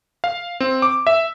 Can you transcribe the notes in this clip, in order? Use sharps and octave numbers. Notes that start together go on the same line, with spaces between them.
F5
C4
D6
E5